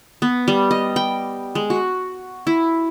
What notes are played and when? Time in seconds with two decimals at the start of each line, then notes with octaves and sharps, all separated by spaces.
0.22 B3
0.48 G3
0.71 D#5
0.96 G5
1.55 G#3
1.70 F#4
2.47 E4